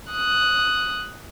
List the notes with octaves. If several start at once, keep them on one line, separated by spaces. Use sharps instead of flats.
D#6 F#6